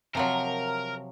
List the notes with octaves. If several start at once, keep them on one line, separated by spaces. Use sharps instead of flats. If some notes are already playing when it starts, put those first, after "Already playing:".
C3 F3 F#3 A#4